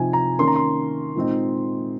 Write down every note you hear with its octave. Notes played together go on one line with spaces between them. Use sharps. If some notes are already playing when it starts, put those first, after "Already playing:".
Already playing: C3 F3 C4 D#4 G#5
A#5
D#3 A#3 C#4 C6
A#5
C6
A#2 G#3 C4 D#4